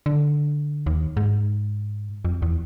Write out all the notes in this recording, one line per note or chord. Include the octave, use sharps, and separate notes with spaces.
D3
D#2
G#2
F2
E2